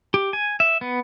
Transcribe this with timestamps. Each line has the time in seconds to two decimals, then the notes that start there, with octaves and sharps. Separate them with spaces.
0.14 G4
0.33 G#5
0.60 E5
0.81 B3